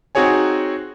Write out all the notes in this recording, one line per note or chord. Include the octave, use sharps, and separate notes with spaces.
C4 D#4 F#4 G#4 C#5 G#5